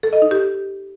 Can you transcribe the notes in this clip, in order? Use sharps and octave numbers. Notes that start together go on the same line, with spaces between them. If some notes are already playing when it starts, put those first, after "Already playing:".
A4
D#5
D#4
G4